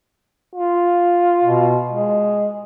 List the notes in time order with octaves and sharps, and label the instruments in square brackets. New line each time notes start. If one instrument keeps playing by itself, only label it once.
[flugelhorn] F4
[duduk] B2
G#3